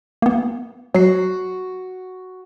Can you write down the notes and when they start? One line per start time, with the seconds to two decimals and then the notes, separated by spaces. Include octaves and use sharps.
0.22 A#3 B3
0.95 F#3 F#4 C7